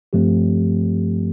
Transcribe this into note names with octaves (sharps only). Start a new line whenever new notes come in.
G2 F3 A3 C4 G4